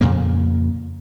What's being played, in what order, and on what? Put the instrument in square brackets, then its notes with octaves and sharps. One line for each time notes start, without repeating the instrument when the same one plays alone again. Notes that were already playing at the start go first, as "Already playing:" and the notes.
[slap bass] F2 A#2 C#3 A#3